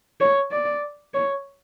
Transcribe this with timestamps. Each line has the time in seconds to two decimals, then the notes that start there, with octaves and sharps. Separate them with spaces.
0.20 C#5
0.52 D5
1.14 C#5